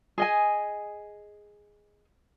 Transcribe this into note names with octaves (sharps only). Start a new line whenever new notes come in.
G#4 D#5 G#5